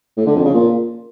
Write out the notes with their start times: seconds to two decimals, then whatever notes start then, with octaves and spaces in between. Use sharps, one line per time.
0.17 A2
0.26 D3
0.36 F2
0.45 C#3
0.54 A#2